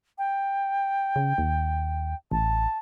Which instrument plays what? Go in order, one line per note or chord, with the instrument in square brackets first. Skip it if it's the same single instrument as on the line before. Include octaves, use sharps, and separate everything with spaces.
[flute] G5
[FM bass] C#3
D#2
[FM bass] A1 [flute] A5